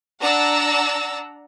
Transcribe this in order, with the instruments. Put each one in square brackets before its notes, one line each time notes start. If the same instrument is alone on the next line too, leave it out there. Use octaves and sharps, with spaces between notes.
[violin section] D4 F#5 A#5 E6 A6